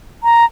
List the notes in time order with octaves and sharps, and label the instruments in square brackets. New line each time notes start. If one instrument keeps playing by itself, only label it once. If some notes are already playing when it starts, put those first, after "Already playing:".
[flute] A#5